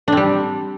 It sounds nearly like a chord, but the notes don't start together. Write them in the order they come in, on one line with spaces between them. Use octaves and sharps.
D4 C4 G3